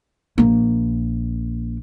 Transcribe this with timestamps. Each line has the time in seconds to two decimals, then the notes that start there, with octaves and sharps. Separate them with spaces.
0.38 A#1 A#3